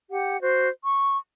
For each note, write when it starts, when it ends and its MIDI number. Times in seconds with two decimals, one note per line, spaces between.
0.10 0.40 67
0.10 0.40 78
0.41 0.68 66
0.41 0.68 72
0.83 1.17 85